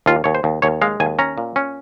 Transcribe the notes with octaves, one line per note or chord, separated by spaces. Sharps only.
D#2 F4
D#2 C#5
C5
D#2
D#2 C#5
G#3 F5
D#2 G#5
C#4 A#5
A#2
C#4